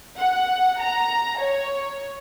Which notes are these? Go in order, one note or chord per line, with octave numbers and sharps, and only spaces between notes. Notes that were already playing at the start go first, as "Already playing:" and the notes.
F#5
A#5
C#5